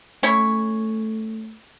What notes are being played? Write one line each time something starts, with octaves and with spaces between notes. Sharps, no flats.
A3 C#4 E4 C#5